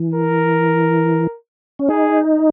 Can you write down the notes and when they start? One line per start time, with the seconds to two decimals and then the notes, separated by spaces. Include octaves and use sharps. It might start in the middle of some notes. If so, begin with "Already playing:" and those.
Already playing: E3
0.14 A#4
1.79 C#4
1.89 D#4 G#4